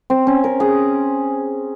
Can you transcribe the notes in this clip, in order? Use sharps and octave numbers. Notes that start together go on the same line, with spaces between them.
C4
C#4
A#4
G#4